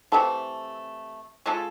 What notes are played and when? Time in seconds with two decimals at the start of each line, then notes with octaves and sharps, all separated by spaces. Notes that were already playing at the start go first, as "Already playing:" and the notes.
0.12 C3 E3 A3 A4
1.46 G#3 C#4 F4 A4